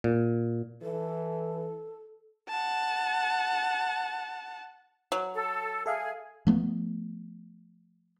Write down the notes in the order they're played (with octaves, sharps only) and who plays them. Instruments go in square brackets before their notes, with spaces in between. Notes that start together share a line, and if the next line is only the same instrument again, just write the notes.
[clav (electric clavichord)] A#2
[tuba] E3 [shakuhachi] A4
[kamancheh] F#5 A5
[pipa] F#3
[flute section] A4
[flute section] G#4 [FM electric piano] A4 E5 F5
[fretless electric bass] F3 A3 B3